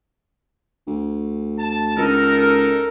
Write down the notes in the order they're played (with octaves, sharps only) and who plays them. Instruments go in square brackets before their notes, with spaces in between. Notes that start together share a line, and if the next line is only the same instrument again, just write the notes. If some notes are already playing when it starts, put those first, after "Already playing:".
[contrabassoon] D2
[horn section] A5
[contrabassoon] C#2 [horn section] D#4 A4 A#4